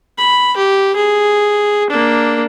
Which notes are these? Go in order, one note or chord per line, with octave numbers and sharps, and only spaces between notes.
B5
G4
G#4
A#3 D4